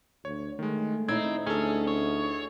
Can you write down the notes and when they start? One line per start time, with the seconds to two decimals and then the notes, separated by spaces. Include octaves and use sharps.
0.25 D2 C#5
0.59 D#3 G#3 A3
1.09 C4 D#4 E4 D#5 G#6
1.46 D2 C#4 G#4 A4
1.87 C#5